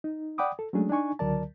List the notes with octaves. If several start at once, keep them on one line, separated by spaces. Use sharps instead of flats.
D#4
D5 F#5 G5 B5 D6 D#6
A4
F#3 G#3 A3 C#4 D4 G#4
D4 D#4 G#5 C#6
C#2 D3 F#3 A#4 D5 A5